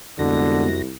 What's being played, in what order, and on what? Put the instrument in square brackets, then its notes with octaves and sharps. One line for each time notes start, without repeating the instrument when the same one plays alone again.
[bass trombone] C2 [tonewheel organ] F2 F#4 A#6 [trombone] D3 [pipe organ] G#3 B3